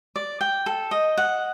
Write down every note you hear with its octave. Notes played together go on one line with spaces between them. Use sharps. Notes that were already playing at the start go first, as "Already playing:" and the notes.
D5
G5
A4
D#5
F#5